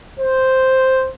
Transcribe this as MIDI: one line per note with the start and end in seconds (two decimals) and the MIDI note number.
0.19 1.10 72